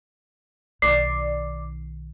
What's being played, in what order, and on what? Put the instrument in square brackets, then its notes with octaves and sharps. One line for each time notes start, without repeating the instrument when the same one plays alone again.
[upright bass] B1 D#3 [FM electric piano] D5 [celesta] C7